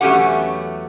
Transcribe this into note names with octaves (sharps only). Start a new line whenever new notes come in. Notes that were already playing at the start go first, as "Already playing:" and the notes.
E2 F#3 A3 C#4 G4 F#5